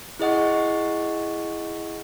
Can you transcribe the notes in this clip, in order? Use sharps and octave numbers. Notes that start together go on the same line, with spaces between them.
E4 G#4 D#5 F#5 C#6